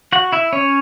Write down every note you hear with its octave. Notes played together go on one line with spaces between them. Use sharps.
F#4 F#5
E4 E5
C#4 C#5